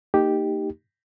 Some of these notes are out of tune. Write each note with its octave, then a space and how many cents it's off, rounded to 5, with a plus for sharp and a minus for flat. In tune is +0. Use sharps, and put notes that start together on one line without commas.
A#3 -35 D#4 +0 G4 +0